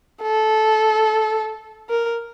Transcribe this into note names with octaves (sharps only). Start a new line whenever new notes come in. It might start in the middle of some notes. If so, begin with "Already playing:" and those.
A4
A#4